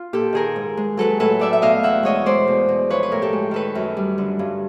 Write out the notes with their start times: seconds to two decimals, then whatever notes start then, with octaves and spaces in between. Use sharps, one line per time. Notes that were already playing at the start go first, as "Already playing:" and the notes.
Already playing: F4
0.13 A#2 G4 A4
0.33 D#3 G#4 A#4
0.56 G#2
0.77 G#3
0.97 F#3 A4 B4
1.20 A2 A4 B4
1.39 A3 D5 E5
1.53 E5
1.62 B2 D#5 F5
1.83 E2 E5 F#5
2.03 G#3 C#5 D#5
2.26 G#3 C5 D5
2.48 B2
2.68 B2
2.90 F3 B4 C#5
3.03 B4
3.12 A2 A#4
3.22 G4 A4
3.33 G#3
3.51 D#3 A4 B4
3.75 F#2
3.97 G3
4.18 D3
4.39 G2